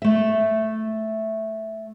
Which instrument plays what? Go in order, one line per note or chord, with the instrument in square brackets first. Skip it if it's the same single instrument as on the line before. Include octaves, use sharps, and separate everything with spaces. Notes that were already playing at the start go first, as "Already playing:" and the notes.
[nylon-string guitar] A3 E5